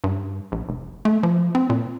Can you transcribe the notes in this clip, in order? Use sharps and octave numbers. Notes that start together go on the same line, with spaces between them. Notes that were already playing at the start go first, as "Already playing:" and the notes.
G2
A#1
F1
A3
F3
C4
A#2